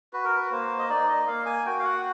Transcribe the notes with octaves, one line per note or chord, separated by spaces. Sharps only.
F#4 B4
A#4
B4
A#3 C5
D#5
D#4 D5
D#5
A#3 F5
G#5
F#4 G5
F5
F#5